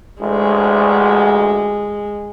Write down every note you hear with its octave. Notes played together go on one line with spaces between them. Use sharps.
A1 D2 G#3